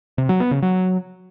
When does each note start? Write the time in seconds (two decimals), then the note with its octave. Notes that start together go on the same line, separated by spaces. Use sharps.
0.18 C3
0.29 F#3
0.40 B3
0.51 C#3
0.62 F#3